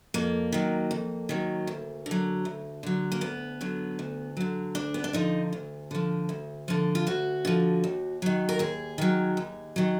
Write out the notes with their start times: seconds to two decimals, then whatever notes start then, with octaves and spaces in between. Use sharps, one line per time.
0.14 F2 A#3
0.52 D#3 F#3
0.91 F2
1.29 D#3 F#3
1.67 D2
2.06 D3
2.11 F#3
2.45 D2
2.83 D3 F#3
3.12 A#3
3.21 D2 B3
3.61 D3 F#3
3.99 D2
4.37 D3 F#3
4.75 D2 D4
4.94 B3
5.04 D4
5.13 D3 F3 D#4
5.53 D2
5.91 D3 F3
6.29 D2
6.68 D3 F3
6.95 F4
7.07 D2 F#4
7.45 D3 F3
7.84 D#2
8.22 D#3 F#3
8.49 A#4
8.59 D#2 G#4
8.98 D#3 F#3
9.37 D#2
9.76 D#3 F#3